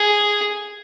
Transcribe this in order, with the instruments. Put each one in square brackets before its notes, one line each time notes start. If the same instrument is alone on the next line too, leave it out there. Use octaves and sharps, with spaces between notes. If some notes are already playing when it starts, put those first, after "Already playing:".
Already playing: [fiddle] G#4